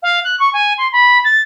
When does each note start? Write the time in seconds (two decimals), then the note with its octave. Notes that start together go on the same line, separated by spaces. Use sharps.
0.02 F5
0.24 F#6
0.39 C#6
0.53 G#5
0.78 C6
0.92 B5
1.24 A6